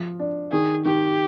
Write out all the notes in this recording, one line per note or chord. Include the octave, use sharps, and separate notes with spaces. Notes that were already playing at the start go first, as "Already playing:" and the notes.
Already playing: F3
D4
D#3 G#4
D#3 G4